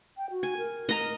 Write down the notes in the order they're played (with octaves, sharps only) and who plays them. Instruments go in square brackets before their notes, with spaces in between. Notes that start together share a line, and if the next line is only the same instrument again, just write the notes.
[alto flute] G5
F#4
[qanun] G#5
[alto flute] A#4
[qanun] D#5 A#5